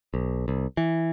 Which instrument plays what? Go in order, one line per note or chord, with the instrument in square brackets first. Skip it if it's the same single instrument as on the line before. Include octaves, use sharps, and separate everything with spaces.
[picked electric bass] B1
C2
E3